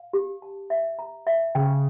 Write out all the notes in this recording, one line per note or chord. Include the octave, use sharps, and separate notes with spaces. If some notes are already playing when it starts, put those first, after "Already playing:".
Already playing: F5
G4
A5
E5
A#5
E5
C#3 G5